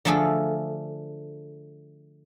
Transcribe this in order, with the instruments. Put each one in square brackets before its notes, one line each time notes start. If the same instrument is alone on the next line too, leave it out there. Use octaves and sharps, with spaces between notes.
[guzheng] D3 F3 A3 D4 G#4 A4